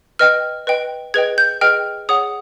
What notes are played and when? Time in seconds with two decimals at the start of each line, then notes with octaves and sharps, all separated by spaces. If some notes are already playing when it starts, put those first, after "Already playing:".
0.19 B4 D#5 G5 F6
0.67 B4 D#5 G5
1.14 G#4 B4 D#5 G5 G#6
1.38 G6
1.61 G#4 B4 D#5 G5 F6
2.09 G#4 C#5 F#5 D#6